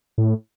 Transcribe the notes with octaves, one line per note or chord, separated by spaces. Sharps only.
A2